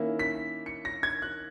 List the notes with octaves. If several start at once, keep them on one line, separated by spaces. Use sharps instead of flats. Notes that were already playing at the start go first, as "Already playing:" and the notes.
Already playing: D#3 A#3 C#4 E4
B6
C#7
A#6
G#6
F#6